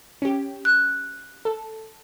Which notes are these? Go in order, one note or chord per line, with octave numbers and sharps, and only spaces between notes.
C#4 G4
F#6
A4